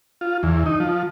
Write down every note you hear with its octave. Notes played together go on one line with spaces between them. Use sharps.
F4
E2
D#4
F3